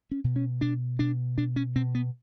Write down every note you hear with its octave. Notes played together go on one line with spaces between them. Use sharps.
C#4
B2
C#4
B2 D4
B2 D4
B2 D4
C#4
B2 C4
B3